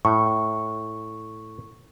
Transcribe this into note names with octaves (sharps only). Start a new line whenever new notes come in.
A2 C#6